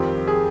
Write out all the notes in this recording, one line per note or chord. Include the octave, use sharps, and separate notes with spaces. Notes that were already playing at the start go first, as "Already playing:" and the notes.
Already playing: F2 D#3 G3 C4 F4 G4
G#4